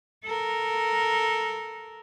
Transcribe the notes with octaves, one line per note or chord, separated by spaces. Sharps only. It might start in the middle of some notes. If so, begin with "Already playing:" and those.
A4 A#4